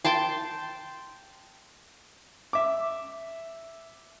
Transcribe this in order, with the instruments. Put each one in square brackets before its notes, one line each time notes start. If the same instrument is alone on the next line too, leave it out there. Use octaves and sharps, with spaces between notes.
[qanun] G5 A5 C6
[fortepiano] E5 D6